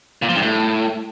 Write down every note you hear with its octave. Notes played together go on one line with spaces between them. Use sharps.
A#2
F3
G2
A2